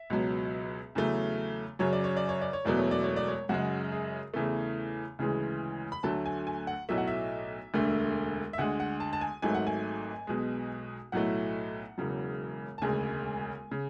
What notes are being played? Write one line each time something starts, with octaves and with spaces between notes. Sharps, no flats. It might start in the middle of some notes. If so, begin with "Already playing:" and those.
Already playing: E5
C#2 B2 F#3
E2 C#3 F#3 A3
F#2 C#3 F#3 C#5
D5
C#5
D5
C#5
D5
C#5
E1 E2 B2 F#3 A3 D5
C#5
D5
C#5
D5
C#5
F#2 C#3 G#3 F#4
G#4
E2 C#3 E3 A3
D2 C#3 E3 G#3
B5
D2 D3 F#3 A3 A5
G#5
G#5
F#5
B1 A2 F#3 A3 E5
F#5
E5
E1 D2 D3 A3
E5
D2 D3 G#3 F#5
F#5
A5
A5
G#5
G#1 G#2 F#3 A3 G#5
F#5
G#5
B1 B2 G#3
B1 A2 F#3 A3 F#5
E1 E2 C#3 F#3
A5
E1 D2 C#3 G#3 G#5
C#3